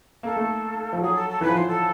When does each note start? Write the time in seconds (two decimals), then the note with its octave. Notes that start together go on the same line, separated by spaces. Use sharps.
0.23 A#3 A4
0.36 A3
0.93 F3
1.02 F#3 G#4
1.15 A4
1.29 A4
1.41 E3 B4
1.49 F3
1.55 E3 C5
1.67 A4